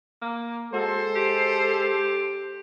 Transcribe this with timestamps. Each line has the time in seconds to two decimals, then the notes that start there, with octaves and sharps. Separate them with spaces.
0.22 A#3
0.74 G#3 F#4 A4 C5
1.15 G4